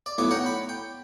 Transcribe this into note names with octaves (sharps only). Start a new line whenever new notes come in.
D5
B1 A2 B3 F#4 D6
C#5 F#5 G5 A#5
B5
G5